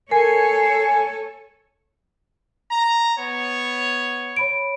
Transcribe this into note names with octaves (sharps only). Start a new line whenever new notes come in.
A4 A#4 C#5 G#5 C7
A#5
B3 C#5
C#5 B5 D7